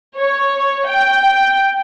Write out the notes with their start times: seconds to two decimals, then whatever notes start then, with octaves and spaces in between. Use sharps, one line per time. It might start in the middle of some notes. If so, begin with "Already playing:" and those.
0.18 C#5
0.87 G5